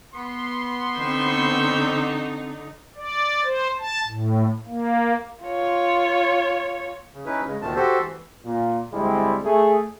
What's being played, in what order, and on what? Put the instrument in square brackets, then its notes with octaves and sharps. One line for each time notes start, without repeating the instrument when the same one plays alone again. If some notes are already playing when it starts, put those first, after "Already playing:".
[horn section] B3 C6
[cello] D3 D#4 [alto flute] C4 [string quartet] C#6 E6 G6
[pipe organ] D5
C5
A5
A2
A#3
[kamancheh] F4 C#5
[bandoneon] C#3
C#4 D#4 E4 B4
C#3 G#3
D2 A#2 D#3 A3 A5
F#4 G4 A4 C5
E3
[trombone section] A#2
D2 G3 G#3 C4 E4
A3 G#4